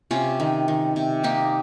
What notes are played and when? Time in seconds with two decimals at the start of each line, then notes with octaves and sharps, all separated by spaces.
0.11 C3 C#4 F4
0.40 D#3
0.68 D#3
0.96 C3
1.23 A#3 D#4 G4